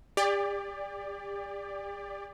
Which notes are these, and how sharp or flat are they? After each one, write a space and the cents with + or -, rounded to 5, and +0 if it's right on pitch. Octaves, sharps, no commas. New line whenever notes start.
G4 +40 D5 +0